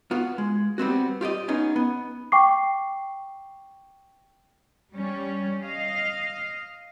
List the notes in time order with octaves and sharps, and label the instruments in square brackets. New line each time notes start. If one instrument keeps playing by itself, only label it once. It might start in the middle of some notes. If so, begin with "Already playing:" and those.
[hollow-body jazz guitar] B3 F4 F#4
G#3
G3 B3 C4 F#4
F4 G4 D5 D#5
B3 C#4 D#4 G#4
B3
[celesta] G5 C#6 D6 C7
[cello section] G3 C#4
D#5 F5